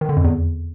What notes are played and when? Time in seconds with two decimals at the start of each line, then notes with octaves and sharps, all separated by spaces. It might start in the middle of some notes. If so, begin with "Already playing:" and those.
0.01 D#3
0.09 D3
0.17 F2
0.24 E2